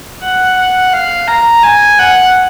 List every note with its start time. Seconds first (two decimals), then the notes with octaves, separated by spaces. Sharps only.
0.22 F#5
0.57 F#5
0.93 F5
1.28 A#5
1.63 G#5
1.99 F#5